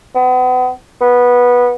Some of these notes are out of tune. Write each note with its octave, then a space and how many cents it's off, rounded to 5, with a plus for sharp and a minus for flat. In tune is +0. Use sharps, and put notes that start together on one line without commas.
B3 +35
B3 -15